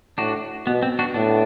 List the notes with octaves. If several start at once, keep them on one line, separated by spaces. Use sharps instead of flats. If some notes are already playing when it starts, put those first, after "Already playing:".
A2 D4 F#4
B2 B3
C4
D4 F#4
A2 B3 D4